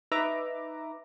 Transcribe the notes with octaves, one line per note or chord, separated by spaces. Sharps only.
D#4 B4 E5 A#5 D6